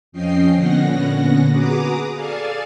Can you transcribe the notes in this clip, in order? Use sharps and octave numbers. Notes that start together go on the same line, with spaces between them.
F2 F3 C#4 D#5 G5 C7
A#2 D3 B3 C#4 F#5 A#6
F#4 G#4 B4 A#5 D6 D#6
G#4 A4 D5 F5 G#5 A5